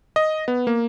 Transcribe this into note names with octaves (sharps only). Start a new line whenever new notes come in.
D#5
B3
A#3